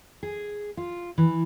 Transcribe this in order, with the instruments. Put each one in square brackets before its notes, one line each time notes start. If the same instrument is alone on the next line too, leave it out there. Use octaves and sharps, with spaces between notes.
[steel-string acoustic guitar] G#4
F4
E3